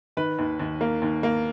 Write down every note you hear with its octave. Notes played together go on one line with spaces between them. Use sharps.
D#3 B4
D#2
D#2
A#3
D#2
A#3